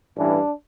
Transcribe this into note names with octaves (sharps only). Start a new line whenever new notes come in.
A1 G2 E3 D4